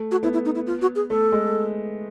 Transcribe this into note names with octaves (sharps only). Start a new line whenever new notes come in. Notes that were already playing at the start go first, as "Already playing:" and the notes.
Already playing: A3
F#4
B3 E4
E4
D#4
E4
F4
F#4
G#4
A3 A4
G#3